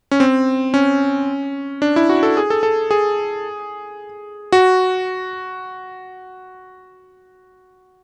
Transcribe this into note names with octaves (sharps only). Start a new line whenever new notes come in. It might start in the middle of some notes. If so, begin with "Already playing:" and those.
C#4
C4
C#4
D4
E4
F#4
A4
G#4
A4
A4
G#4
F#4